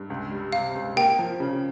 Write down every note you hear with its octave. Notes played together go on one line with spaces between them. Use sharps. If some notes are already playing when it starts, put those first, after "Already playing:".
Already playing: G2
C#2
G3
C3 F5
C#2
A#3 G5
F3
C#3